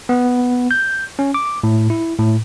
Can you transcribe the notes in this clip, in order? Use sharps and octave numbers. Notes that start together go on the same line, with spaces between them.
B3
G6
C#4
D6
A2
E4
A2